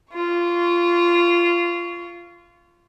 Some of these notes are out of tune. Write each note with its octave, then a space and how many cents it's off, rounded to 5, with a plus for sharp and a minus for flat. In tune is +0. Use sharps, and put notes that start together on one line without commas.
F4 -15 C#6 +15